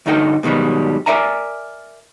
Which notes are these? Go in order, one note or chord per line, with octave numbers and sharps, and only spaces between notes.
D2 G2 D3 D#4 A4 G5
G#2 B2 D#3 F#3 G3
A#4 B4 D5 E5 G#5 A#5